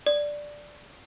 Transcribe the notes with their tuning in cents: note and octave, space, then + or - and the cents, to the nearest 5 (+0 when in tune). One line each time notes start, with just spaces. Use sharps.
D5 +0